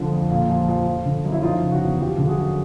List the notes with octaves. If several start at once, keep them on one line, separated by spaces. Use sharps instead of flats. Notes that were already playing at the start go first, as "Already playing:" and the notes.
Already playing: D3 F3
F2
A#2
F3
F3
F3
D3
F#2
E4
F3 D#4 F4
C#3
E4 F#4
E2
F3 F4 G4
D3 A4
F#4 G#4
F#2